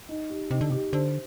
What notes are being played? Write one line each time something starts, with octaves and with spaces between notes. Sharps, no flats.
D#4
G4
C3 D#4
D3
C3 G4
D3 C5